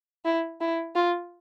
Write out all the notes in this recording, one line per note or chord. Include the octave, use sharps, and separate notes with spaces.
E4
E4
F4